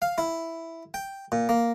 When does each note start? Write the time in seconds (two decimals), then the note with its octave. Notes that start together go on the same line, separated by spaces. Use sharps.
0.02 F5
0.18 E4
0.94 G5
1.32 A#2
1.49 A#3